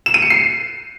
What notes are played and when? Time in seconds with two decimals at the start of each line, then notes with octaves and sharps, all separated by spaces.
0.06 E7
0.14 D#7
0.22 C#7
0.30 C7